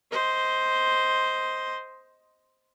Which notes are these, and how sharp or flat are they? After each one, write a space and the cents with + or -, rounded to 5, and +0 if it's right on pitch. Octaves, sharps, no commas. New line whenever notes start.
C5 +0 D#5 +15